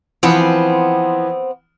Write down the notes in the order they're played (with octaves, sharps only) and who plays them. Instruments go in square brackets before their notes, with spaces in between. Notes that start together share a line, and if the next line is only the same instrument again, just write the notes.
[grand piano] E3 F3 [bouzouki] B3 C4